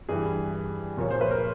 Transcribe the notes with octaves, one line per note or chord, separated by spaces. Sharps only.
G2 E3 G3 G#4
A#2 F3 A#3 C#5
C5
B4
A#4